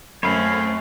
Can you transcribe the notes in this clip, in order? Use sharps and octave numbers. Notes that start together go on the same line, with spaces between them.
F#2 A3 C4 C#4 C#5 F5 B5